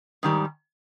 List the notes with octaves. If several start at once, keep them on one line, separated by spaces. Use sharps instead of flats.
G#2 D#3 G3